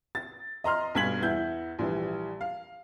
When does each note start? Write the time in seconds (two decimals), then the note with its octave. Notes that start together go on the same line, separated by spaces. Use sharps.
0.15 A6
0.64 D#5 A#5 C6 F6
0.95 B1 G2 G#6 B6 F#7
1.22 E2 E4 G6
1.79 A#1 E3 G3
2.41 F5